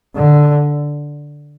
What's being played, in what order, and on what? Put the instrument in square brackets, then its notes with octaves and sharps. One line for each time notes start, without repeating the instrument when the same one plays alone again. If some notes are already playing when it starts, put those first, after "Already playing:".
[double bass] D3